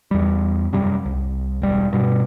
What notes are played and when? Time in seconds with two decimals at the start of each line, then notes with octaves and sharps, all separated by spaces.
0.11 E2 G3
0.73 F#2 C3 G3
1.05 C2
1.62 E1 G3
1.93 G2 B2